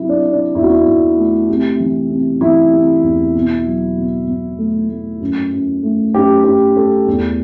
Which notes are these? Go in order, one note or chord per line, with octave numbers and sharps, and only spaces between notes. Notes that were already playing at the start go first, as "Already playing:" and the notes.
Already playing: C3 F#3 E4
D4
C3
D4
E2 E4
F#4
E4
E2
A3
C3
E3
C3
E3 E4
C3
E2
B2
F#3
B2
B2
A3
A3
F#2
F#2
A3
F#2 G4
F#2 G4
A3 A4
E2